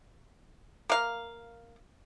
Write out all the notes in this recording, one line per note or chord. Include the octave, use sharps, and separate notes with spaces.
A#3 F5